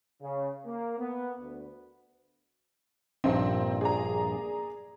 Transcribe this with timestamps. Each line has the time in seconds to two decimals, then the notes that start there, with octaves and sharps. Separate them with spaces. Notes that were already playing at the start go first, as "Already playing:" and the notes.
0.22 C#3
0.65 A#3
0.99 B3
1.40 D2
3.24 A#1 G2 A#2 C4 D#4
3.81 G#4 D5 A#5